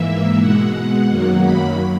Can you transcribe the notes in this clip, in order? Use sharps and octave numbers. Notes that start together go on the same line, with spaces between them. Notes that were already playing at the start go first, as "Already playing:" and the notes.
Already playing: G#2 E3 A#3 E5
B2 G#3 F#5
F#2 D#3 F#3 A#3
B5